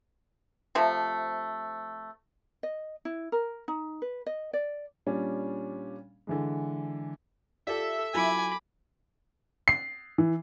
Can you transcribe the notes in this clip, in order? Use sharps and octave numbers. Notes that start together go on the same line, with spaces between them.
C3 F3 A3
D#5
E4
A#4
D#4
B4
D#5
D5
A#2 G3 C#4 D4
D3 E3 G#3
F4 G4 A4 D5 E5
F#3 E4 F4 G#5 B5 D6
C7
E3